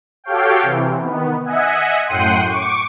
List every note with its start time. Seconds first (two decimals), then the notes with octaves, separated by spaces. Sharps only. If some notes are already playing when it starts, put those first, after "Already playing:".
0.24 F#4 G4 A4 C#5 F5 G5
0.62 C3 E3
1.01 D#3 B3
1.45 D#5 E5 F#5 G#5
2.06 F#2 A2 F#5 G5 C6 D#7
2.45 C#6 D6